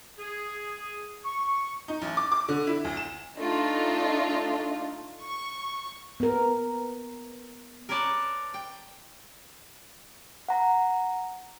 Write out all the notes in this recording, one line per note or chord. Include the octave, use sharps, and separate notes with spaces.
G#4
C#6
D#4
A1
D6
D6
D3
E4
D2
E7
A3 D4 D#4 F4
C#6
B3 A#4
A#4 B4 C#5 D5 A5
G5
F#5 A#5